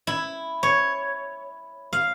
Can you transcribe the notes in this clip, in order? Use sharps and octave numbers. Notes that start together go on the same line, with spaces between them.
E4
C#5
F5